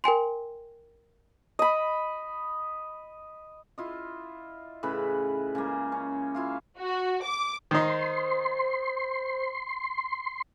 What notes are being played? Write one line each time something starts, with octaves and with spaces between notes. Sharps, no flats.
A#4 G5 G#5 C6
D#5 B5
E4 F4 D#5
A2 C#3 B4 B5
C#3 G#3 A#3
C#4
E4 F4 F5
F#4
D6
D#3 D#4 C5 C6